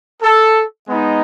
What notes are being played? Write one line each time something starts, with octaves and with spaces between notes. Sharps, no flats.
A4
G#3 B3 D#4